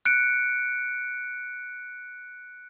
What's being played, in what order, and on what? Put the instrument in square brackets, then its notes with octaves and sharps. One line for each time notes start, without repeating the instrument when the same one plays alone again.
[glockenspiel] F#6 C#7 D7